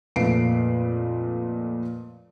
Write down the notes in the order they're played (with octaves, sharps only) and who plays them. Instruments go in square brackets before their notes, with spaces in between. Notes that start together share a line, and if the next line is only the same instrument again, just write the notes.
[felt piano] F2 A#2 A3 B4 C7 D7